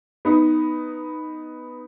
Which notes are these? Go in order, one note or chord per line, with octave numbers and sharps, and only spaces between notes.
B3 D#4